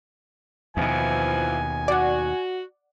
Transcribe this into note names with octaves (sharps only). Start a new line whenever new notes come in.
D#2 B2 E3 F3 G#5
F#4 D5 F#5